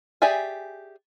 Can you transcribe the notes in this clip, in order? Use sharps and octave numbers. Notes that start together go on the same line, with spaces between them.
G4 G#4 D5 E5 G#5